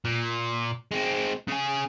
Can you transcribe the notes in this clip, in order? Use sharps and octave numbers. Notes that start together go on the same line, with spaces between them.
A#2
G#3 C4
C#3 G#4